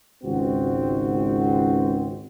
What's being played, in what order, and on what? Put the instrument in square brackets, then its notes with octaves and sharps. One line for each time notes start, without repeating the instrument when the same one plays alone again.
[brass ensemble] G#1 C#2 C4 F#4